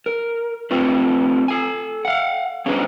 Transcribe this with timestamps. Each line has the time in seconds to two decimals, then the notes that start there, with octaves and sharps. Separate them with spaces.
0.06 A#4
0.71 A3 C4 F4 B4
1.48 A4 G#5
2.05 F5 F#5
2.66 B3 C#4 D4 G#4 B4 C5